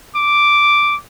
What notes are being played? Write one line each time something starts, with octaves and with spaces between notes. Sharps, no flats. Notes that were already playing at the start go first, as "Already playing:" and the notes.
D6